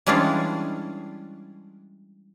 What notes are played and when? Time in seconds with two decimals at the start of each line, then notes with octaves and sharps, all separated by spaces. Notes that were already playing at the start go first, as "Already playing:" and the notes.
0.07 E3 G3 G#3 C#4 D4 F4